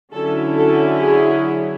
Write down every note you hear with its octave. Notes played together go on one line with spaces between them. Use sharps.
D3 F#3 C#4 E4 A4
A4
G#4